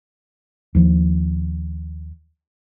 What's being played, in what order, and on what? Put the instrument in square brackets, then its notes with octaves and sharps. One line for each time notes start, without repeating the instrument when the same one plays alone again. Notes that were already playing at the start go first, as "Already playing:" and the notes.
[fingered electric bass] D#2 F3